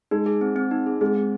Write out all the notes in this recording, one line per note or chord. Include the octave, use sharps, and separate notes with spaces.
G#3 D#4
G#4
C4
C4
D#4
G#4
G#3 C4
C4